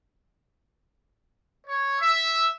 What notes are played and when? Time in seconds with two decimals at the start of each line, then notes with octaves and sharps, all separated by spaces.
1.67 C#5
1.99 E5